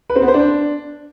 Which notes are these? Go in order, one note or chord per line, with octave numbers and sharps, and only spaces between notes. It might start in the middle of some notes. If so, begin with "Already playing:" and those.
B4
C4
B3
C5
D4